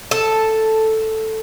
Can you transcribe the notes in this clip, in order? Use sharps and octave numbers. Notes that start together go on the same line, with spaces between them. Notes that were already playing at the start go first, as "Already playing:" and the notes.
A4